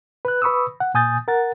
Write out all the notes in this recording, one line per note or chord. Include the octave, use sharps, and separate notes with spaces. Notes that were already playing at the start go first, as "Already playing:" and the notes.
B4 F#6
B4 B5 C#6 D#6 E6
F#5
A#2 G#5 D#6 G6 A6
A#4 F#5 A6